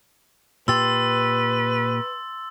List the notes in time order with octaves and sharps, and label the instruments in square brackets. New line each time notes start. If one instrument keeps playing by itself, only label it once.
[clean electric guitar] A#2 G4 [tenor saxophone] B4 [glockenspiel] C6 A6 [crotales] E6